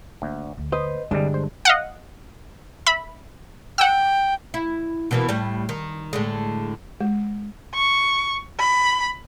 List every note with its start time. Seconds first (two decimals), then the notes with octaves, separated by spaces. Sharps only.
0.22 D2 A#3
0.57 D2 A3
0.72 B4 C5 D#5
1.11 C2 G2 D3 G3 G#3 D4
1.34 C5
1.65 D#5 F5 F#5
2.86 E5 B5
3.78 F#5 G5 E6
4.54 E4
5.11 B2 E3 A#3
5.29 A2 G3
5.69 D#3
6.13 A2 D3 G#3
7.01 G#3
7.74 C#6
8.60 B5